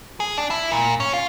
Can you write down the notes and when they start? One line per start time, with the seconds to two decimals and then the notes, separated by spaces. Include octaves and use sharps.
0.20 G#4
0.38 D4
0.50 E4
0.71 A#2
1.00 C#4
1.13 F4